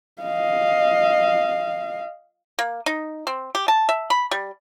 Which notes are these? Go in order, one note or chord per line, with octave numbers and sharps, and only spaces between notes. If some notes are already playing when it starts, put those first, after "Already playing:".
D#5 F5
A#3
D#4
C4
G4
A5
E5
B5
G3